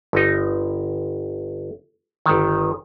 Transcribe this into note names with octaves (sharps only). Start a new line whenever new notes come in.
G1 D#4
G1 D#3